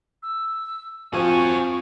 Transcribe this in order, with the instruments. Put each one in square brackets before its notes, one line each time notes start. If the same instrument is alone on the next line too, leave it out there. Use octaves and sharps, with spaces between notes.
[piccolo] E6
[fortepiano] F3 C4 [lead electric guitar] F#4 G#5 [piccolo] C#6